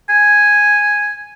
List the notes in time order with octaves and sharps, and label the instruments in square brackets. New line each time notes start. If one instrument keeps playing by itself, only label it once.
[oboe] G#5